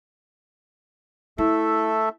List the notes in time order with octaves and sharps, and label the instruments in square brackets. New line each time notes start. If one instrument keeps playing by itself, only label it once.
[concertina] A3 A4 E5 [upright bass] E4